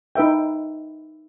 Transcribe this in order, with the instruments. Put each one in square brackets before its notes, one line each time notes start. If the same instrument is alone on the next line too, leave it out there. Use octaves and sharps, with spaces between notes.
[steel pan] D#4 B4 E5 G5